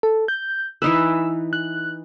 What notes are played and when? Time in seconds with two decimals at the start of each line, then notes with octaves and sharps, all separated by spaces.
0.03 A4
0.28 G6
0.82 E3 D#4 B4 E6
1.53 F#6